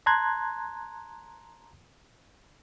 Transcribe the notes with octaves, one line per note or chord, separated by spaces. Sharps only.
A5 A#5 C6 F#6 G#6